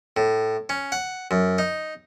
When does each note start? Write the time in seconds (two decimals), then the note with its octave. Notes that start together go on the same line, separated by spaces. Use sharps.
0.17 A2
0.69 C#4
0.92 F#5
1.31 F#2
1.58 D#4